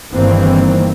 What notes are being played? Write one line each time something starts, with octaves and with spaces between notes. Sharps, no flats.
G1 G2 D#3 E3 A#3 C4